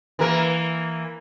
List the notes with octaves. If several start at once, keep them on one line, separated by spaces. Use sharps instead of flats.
E3 A#3 A#4